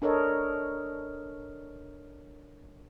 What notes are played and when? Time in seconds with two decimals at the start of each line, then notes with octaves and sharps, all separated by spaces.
0.02 D4 A4 A#4 C#5 D#5